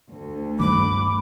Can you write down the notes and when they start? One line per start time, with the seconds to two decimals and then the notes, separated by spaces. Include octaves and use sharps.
0.14 D2
0.59 G2 D#3 A3 B5 D6